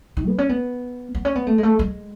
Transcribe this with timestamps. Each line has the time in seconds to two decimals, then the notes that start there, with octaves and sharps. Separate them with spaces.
0.17 D#3
0.27 B3
0.38 C#4
0.49 B3
1.15 B3
1.25 C#4
1.35 B3
1.47 A3
1.58 G#3
1.63 A3
1.79 G#3